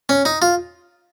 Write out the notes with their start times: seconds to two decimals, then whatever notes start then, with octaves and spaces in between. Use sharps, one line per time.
0.09 C#4
0.25 D#4
0.42 F4